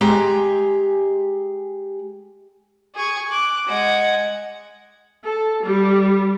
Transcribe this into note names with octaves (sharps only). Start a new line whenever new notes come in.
G#3 G4 G#4 G#5 A#5
G#4 C#6
D6 F#6
G#3 F#5
A4
G3